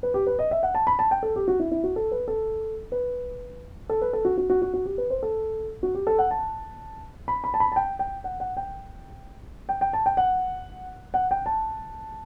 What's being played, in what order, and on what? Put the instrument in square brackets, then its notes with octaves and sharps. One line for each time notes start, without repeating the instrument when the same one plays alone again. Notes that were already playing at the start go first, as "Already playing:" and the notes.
[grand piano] B4
G4
B4
D#5
E5
F#5
A5
B5
A5
G5
A4
G4
F#4
E4
E4
F#4
A4
B4
A4
B4
A4
B4
A4
F#4
F#4
F#4
F#4
F#4
G4
B4
C5
A4
F#4
G4
A4
F#5
A5
B5
B5
A5
B5
A5
G5
G5
F#5
F#5
G5
G5
G5
A5
G5
F#5
F#5
G5
A5